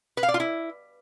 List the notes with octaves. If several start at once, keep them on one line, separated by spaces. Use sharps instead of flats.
B4
F5
D5
F4
E4